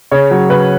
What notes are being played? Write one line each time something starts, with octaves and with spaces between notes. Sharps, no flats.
C#3 C#5
F#3
C#3 B4